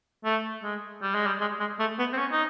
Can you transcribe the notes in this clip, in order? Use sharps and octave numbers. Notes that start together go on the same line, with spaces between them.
A3
G#3
G3
G#3
G3
G#3
G#3
A3
B3
C4
C#4
D#4